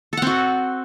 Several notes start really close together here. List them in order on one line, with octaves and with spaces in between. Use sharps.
A4 F#5 C4 F#4